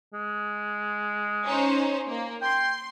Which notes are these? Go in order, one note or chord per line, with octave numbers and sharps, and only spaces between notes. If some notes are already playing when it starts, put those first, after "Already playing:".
G#3
C#4 D#4 C5
A#3
G5 C6